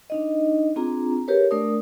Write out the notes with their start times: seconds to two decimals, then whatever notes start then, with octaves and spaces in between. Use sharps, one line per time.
0.10 D4 D#4 D#5
0.76 C4 D4 F4 G#4 A#5
1.28 G4 G#4 A#4 B4 C#5
1.51 A3 D4 A#4 D5 D#6